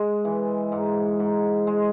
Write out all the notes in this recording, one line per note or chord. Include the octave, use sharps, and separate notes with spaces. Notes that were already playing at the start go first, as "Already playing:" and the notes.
Already playing: G#3
E3
G#2
G#2
G#3